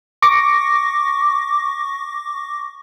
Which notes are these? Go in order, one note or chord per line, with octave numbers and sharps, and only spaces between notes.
C#6 D6 A#6